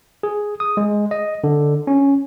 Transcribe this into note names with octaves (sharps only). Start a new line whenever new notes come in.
G#4
D#6
G#3
D#5
D3
C#4